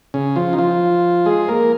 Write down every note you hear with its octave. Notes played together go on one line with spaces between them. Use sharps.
C#3 C#4
F3 F4
D#4
F3 F4
G#3 G#4
A#3 A#4